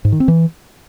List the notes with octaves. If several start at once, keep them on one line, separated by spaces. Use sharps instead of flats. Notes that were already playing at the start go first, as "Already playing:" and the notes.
G#2
D#3
C4
E3